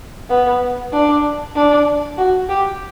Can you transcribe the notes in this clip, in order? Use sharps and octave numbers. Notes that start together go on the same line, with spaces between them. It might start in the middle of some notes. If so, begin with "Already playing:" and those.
B3
D4
D4
F#4
G4